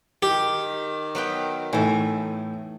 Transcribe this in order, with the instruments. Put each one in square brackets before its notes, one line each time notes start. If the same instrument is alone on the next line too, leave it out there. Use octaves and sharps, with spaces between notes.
[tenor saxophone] D#3 [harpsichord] G4
[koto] F#3 B3 G5
[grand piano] A2 D#4 G#5 [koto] E3 A3